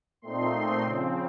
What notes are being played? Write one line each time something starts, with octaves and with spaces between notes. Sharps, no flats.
A#2 A3 C4 D#4 C6
C#3 F3 C4